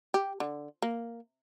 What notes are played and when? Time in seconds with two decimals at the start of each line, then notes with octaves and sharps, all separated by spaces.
0.14 G4
0.40 D3
0.82 A#3